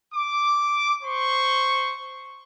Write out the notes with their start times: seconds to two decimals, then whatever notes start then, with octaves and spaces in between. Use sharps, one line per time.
0.15 D6
1.03 C5 C6 C#6